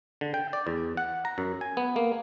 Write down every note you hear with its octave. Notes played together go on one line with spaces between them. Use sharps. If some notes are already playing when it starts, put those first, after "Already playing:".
D3
G5
D5
E2
F#5
A#5
F#2
G#5
B3
A#3